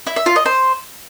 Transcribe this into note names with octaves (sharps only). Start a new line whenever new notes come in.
E4
E5
F4
D#5
C5